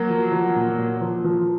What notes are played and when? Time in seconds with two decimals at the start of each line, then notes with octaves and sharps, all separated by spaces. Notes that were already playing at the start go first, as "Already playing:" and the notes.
Already playing: F#3 A#3
0.10 F3
0.32 F3
0.56 A#2
0.78 A#2
1.01 F3
1.24 F3